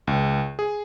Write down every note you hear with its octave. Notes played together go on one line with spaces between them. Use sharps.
C#2
G#4